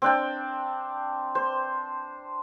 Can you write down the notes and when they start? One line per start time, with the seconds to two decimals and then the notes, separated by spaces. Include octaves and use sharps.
0.02 C4 D4 G5
1.35 C5